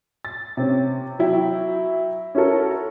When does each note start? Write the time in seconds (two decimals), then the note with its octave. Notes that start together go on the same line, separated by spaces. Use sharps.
0.25 A6
0.57 C3 C4 C#4
1.19 F#3 E4 G5
2.35 C#4 E4 F#4 A4 A#4